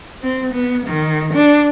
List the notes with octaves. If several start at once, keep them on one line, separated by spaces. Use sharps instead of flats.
C4
B3
D#3
D4